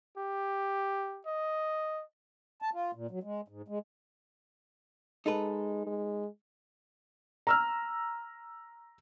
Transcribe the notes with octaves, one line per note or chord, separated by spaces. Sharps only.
G4
D#5
A5
F4
A#2
F#3
G#3
G#2
G#3
G#3 D#4 A4 B4
G#3
A#5 E6 F6